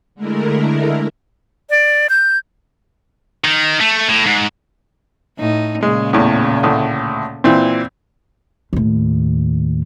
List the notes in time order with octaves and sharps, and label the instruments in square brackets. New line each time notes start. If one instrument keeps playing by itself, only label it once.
[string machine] D3 G#3 A3 E4 A#4
[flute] D5
G6
[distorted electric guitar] D#3
A3
A2
G#2
[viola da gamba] A2 D#4
[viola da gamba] A#2 C#3 [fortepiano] G#3
[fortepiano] E2 A2
D2 A2
A#2 E3 C4
[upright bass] D#2 A2